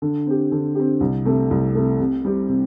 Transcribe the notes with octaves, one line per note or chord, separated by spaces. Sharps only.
D3
C4 G4
D3
C4 G4
C2
C3 A3
C2
C3 A3
C3
G3 C4 G4
C3